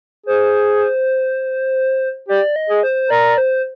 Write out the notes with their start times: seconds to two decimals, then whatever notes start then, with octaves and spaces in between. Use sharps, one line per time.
0.26 G#4 C5
2.29 G4 D5
2.56 D#5
2.69 G#4
2.83 C5
3.10 A#4 D5
3.38 C5